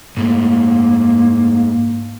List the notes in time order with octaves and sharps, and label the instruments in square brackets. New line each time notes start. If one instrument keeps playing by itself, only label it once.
[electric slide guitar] G#2 A3 [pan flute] A#3